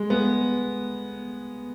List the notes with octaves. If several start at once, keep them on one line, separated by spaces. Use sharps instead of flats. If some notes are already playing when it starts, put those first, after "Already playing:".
Already playing: G#3
G#3 B3